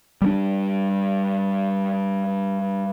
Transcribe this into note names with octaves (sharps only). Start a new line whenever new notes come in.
G3 A3 D4